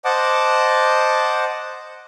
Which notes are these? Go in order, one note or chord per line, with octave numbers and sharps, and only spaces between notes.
C5 D#5 F#5 A5 D6